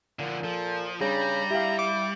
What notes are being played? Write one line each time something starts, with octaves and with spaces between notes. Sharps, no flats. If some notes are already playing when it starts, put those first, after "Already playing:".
A#2 D3 F3
F3 A4
C#3 G3 D4 G#4 A#5
E4 G4 F5
D6